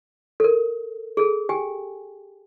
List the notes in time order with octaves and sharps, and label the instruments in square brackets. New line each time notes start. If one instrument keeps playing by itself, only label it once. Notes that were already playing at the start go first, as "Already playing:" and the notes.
[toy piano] A4 A#4
G#4 A4
G4 G5 G#5